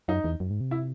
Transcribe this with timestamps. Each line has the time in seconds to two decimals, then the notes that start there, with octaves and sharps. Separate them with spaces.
0.08 F#2 D#4
0.24 E2
0.40 F#2
0.50 G#2
0.61 C3
0.71 E4